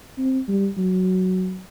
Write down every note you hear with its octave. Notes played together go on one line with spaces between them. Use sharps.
C4
G3
F#3